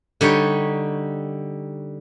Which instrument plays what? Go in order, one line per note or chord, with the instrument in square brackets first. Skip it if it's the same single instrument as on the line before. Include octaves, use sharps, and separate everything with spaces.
[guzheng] D3 G3 D#4 C#5